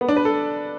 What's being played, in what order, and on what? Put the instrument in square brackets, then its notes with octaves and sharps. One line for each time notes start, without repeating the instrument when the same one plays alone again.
[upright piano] B3
D4
B4
A4